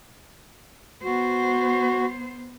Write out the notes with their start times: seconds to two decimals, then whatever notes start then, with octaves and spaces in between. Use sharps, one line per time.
1.04 B3 F#4 C5